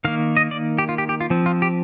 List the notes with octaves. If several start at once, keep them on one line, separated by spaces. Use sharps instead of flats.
D#3 A#3 F5
D#5
D5
G4
F4
G4
G4
F4
F3 C4
F4
G4